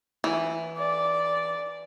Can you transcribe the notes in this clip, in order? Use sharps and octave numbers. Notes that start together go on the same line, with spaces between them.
E3
D5